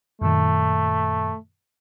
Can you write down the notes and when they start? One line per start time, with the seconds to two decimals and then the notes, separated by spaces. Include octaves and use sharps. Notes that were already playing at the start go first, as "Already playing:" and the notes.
0.22 F#2 A#2 D#3 A3